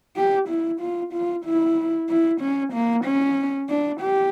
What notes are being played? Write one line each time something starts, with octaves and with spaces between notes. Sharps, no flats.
G4
E4
F4
F4
E4
E4
C#4
A#3
C#4
D4
G4